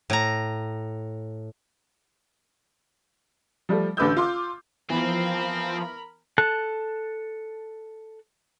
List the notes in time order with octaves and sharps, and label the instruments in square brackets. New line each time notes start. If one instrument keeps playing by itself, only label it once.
[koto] A2 A#5
[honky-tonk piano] F3 G3 A3
A1 D3 B4 D6 E6 G6
F4 C6 D6
[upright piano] E3 B3 [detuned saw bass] F3 [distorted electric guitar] C4 [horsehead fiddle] A#4 B5
[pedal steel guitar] A4 A5 F#6